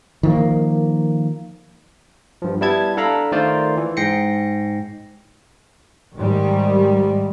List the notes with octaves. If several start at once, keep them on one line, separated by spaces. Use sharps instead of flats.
D#3 F3 A#3
G2 F3
G3 B3 E4 A5 G#6
D4 A4 F5 A#5 B5
D#3 A3 F4 A#4 C5 D5
E3
G#2 G5 A#6 C7 C#7
G#2 D#3 G3